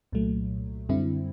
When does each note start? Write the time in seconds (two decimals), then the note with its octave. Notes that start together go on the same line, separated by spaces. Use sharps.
0.12 C2 A#2 F#3 A3
0.89 F#2 D3 G3 C4 E4